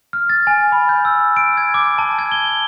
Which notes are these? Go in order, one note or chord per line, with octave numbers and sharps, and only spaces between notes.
F6
A6
G#5
B5
G6
E6
D7
G#6
D6
A5
G#6
G7